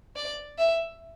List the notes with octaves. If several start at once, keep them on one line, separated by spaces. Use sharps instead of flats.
D5
E5